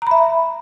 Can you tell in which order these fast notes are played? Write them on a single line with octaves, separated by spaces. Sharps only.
A#5 B5 E5